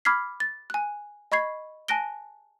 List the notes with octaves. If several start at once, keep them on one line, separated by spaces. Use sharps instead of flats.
B5 D6 F6 G#6 B6 C7
A6
G#5 F#6
D#5 B5 C#6 G#6 C7
G#5 A5 F#6 A#6 D7 G7